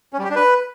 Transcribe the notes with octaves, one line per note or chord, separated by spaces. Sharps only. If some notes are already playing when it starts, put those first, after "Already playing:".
C#4
G3
G4
D4
B4